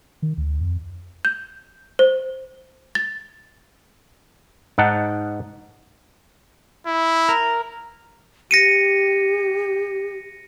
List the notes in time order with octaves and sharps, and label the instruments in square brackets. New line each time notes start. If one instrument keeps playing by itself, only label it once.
[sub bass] D#3
D2
F2
[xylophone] G6
C5
A6
[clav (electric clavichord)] G#2 D#4 F#5 A5
[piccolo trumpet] E4
[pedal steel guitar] A#4
[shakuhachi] G4 [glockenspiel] A#6 C#7 D#7